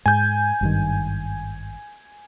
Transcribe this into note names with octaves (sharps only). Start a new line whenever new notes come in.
G#2 G#5 G6
G#1 G2 D#3